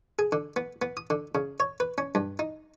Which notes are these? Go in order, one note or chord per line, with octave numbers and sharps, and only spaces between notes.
G#4
D3
B3
B3
D#6
D3
C#3
C#5
B4
C#4
G2
D#4